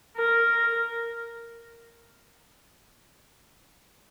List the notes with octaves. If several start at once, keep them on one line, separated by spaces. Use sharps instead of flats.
A#4